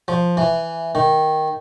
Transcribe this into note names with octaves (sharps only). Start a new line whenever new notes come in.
F3
E3
D#3